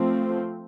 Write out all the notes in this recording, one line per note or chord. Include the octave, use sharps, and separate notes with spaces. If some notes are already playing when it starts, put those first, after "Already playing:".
Already playing: F3 A3 C4